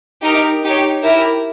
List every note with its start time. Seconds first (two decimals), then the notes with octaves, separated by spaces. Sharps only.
0.23 D#4 G4 A#4
0.63 D#4 G4 C#5
1.03 E4 G4 A#4